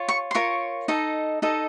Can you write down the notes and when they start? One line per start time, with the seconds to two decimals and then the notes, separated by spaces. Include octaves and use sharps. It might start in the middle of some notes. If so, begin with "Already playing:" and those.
Already playing: F4 C#5
0.09 C#6
0.31 C6
0.35 F4 A#4 C#5 C#6
0.88 D#4 A4 D#5
1.42 D#4 A4 D#5